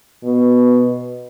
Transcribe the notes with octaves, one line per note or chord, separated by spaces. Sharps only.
B2